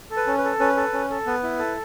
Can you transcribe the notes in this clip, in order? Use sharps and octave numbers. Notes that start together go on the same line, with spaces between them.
A4
B4
C#4
B4
A4
C#4 B4
A4
C#4
A4
B3 B4
E4
A4